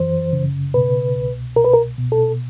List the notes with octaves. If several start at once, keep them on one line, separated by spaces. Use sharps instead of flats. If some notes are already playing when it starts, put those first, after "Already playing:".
Already playing: F#2 E3 C5
C#3
B2 B4
C2
B2 A#4
B4
A#4
B2
A4